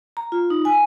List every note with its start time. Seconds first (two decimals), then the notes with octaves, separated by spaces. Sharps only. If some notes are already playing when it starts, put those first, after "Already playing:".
0.17 A#5
0.32 F4
0.50 D#4
0.65 G#5